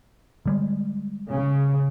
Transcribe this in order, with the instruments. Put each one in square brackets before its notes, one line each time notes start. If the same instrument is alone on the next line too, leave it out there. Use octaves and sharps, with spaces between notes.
[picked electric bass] D3 G3 G#3
[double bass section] C#3